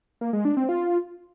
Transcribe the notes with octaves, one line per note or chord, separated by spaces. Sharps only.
A#3
G#3
D4
C4
F4